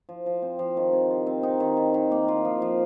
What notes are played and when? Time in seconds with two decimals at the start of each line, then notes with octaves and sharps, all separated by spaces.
0.09 F3
0.26 F3
0.42 C4
0.59 F3
0.77 D#3
0.93 C3
1.10 F4
1.27 C4
1.43 D#4
1.60 D#3
1.77 D#3
1.94 D#3
2.12 A#3
2.28 F4
2.45 F3
2.62 F3